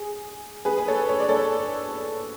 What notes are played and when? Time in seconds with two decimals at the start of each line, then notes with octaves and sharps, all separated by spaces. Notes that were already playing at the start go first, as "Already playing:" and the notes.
Already playing: G#4
0.65 G#4 B4
0.78 B4
0.88 A4 C#5
1.09 C#5
1.20 D5
1.29 A4 C#5